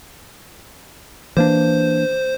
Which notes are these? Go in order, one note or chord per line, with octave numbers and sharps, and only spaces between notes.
E3 A#3 D4 C5